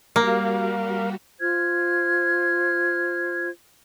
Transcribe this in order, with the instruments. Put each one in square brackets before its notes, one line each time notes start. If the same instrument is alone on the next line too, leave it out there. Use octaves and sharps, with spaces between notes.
[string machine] G3 F#4 G4 [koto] A#3 [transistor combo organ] A#4 F5
[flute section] F4 C5 F6 G#6